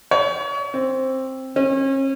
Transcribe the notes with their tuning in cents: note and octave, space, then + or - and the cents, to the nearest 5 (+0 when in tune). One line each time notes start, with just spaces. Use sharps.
C#5 +30
C4 +10
C#4 -40